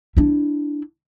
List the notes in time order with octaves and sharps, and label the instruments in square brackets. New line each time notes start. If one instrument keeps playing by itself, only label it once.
[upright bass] D4 E4